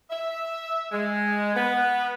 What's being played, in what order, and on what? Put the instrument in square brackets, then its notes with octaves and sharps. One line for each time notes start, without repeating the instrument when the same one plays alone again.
[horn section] E5
G#3
B3